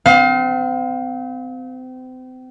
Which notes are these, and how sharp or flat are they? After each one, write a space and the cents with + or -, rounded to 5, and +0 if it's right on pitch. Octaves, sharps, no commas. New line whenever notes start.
C4 -35 F5 +25